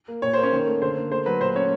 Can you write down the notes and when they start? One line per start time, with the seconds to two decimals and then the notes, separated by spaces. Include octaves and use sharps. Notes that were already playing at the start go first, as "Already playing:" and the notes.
0.08 A#3
0.22 A#2 C#5
0.33 A#3 C5
0.43 C#4 C#5
0.52 D#3
0.67 A3
0.82 D3 C5
0.97 A#3
1.11 A3 C5
1.26 F#3 B4
1.40 A#2 C5
1.55 A3 C#4 C#5